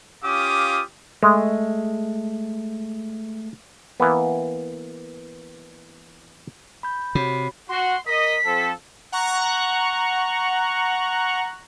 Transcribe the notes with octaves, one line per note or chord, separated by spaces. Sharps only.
C#4 F4 G4 F5 D6 D#6
G#3 A3
E3 A#3 B3
B5 G6
C3 F#4 C#5 B5
F#4 C6
A#4 D#5 B6
F3 C4 A4
F#5 A#5 C#6 F#6